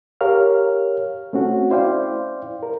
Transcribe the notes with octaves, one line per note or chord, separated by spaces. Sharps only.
G4 A#4 C#5 F5 F6
A3 C4 C#4 F#4
E4 C5 D5 F5 G5
A#4